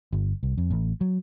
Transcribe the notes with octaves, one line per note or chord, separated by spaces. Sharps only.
G1
C2
F2
A1
F#3